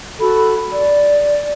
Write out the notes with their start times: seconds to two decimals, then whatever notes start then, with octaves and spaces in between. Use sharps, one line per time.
0.20 F#4 A4 B5
0.73 D5